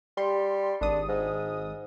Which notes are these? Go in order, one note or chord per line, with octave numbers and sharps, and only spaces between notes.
G3 C6
G#1 D4 D#6
G#2